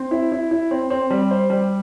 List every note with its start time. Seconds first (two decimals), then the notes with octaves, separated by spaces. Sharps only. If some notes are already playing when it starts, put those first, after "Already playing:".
Already playing: C4
0.11 E4
0.32 E4
0.51 E4
0.71 C4
0.90 C4
1.10 G3
1.31 C5
1.50 G3